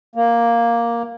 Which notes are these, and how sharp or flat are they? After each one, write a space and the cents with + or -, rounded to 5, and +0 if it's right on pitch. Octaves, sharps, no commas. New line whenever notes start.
A#3 +5